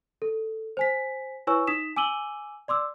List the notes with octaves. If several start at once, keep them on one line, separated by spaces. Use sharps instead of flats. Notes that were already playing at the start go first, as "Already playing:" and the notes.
A4
C5 G#5 B6
E4 B4 C#5 G#5 C#6 E6
D#4 D#6 B6 E7
G#5 D6 E6 D#7 F#7 G7
D5 C6 D6 E6